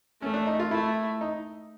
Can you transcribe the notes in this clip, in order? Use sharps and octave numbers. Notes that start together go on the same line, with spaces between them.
A3 C#4
D4
D#4
F4
A3 E4
D#4